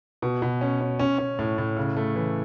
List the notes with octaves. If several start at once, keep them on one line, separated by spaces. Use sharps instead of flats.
B2
B2
C#4
C#4
C#4
C#4
A2
A2
C#3
A3
E3